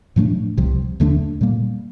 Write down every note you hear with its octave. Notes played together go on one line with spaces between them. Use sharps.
A2 F3 A3 D4
C2 C3 F3
D#2 D3 A3 D4
A#2 G3 A#3